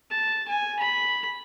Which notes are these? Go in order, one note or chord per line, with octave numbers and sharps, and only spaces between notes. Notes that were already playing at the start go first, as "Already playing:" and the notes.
A5
G#5
B5